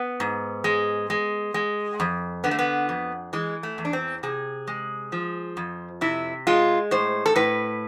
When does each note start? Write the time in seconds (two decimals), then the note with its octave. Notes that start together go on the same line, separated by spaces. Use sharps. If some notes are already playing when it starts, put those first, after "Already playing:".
Already playing: B3
0.20 G#2
0.64 G#3
1.10 G#3
1.54 G#3
2.00 F2
2.44 D3 B3
2.51 A3
2.59 B3
2.89 F2
3.33 E3 G#3
3.63 A3
3.78 E2
3.85 D4
3.93 C4
4.23 C3 G#4
4.67 G#3
5.12 F3
5.57 F2
6.01 C3 E4
6.47 G#3 F4
6.91 A2 C5
7.26 A4
7.36 A2 B4